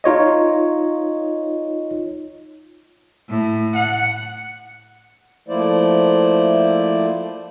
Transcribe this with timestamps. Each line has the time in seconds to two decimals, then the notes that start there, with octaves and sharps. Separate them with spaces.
0.04 D#4 F4 C#5 D#5
3.29 A2
3.76 F#5
5.48 F3 A3 A#3 E4 C5 D5